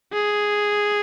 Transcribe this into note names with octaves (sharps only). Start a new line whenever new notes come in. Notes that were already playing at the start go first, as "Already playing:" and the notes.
G#4